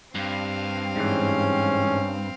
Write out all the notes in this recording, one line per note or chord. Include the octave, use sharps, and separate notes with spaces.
G2 C4 F5
G#2 E3 C#4